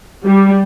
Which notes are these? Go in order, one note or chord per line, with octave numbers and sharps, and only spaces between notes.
G3